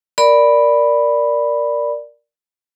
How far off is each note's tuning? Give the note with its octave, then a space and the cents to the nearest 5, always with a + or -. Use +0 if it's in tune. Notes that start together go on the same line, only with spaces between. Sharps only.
A#4 +0 D5 +0 B5 +0